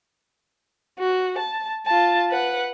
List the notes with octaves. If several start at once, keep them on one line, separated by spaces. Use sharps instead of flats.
F#4
A5
F4 A5
B4 F#5